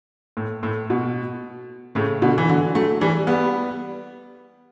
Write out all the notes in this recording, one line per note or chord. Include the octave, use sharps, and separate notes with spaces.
A2
A2
B2
A2 C#3
B2 D3
E3
D3 F#3
F#3 A3
E3 G3
G3 B3